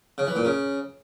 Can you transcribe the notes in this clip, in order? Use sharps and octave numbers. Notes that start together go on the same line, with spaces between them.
C#3
E3
A#2
C#3